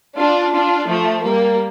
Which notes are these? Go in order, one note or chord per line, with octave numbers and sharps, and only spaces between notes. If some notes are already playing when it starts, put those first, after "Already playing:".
D4 F4
D4 F4
F3 A3
G3 A#3